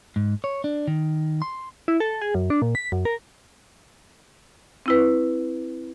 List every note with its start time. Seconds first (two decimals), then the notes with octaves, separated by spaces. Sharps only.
0.16 G#2
0.44 C#5
0.64 D4
0.87 D#3
1.42 C6
1.88 E4
2.00 A4
2.22 G#4
2.35 F#2
2.50 D4
2.62 A#2
2.75 B6
2.92 F#2
3.05 A#4
4.86 C4 E4 B4